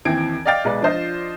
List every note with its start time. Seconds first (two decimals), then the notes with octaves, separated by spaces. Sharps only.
0.05 D#2 E3 C4 G#6 D7
0.45 D5 D#5 F5 G5 A6
0.64 B1 G#3 B4 D5
0.81 F3 D4 F4 C5 D#5